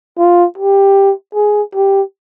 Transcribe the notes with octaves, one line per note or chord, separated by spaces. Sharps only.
F4
G4
G#4
G4